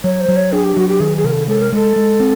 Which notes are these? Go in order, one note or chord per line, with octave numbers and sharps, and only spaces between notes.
F#3 C#5
C5
F#3
C#5
D4 G#4
G4
F#3 F#4
G4
D#3 G#4
G#4
C3 A#4
A4
G#3 A4
A#4
G#3 A4
G#3
C4